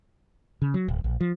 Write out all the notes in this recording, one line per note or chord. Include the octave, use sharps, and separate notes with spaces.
C#3
F#3
D1
A#1
F3